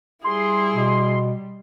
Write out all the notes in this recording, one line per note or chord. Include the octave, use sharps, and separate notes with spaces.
G3 E4 G#4 C6
B2